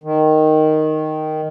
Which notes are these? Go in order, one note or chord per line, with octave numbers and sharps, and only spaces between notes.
D#3